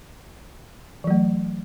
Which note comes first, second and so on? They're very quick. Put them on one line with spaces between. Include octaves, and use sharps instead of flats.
E3 F#3 A3